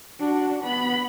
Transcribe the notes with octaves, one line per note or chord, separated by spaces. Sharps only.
D4 F#4
B3 B5